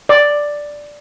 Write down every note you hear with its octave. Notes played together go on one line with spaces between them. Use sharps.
D5